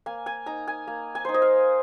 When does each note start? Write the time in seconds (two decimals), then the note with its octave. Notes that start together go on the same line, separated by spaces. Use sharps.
0.06 A#3 G#5
0.26 G#5
0.46 D#4 A#5
0.68 G#5
0.87 A#3
1.15 G#5
1.25 D#4 C5
1.34 D#5
1.42 F5